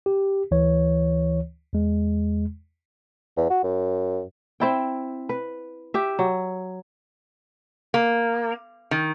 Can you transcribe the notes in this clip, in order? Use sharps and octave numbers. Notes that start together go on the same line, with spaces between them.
G4
D2 E3 C#5
E2 G#3
E2
F#4
F#2
C4 E4 G5
B4
G4 E5
F#3
A#3
D#3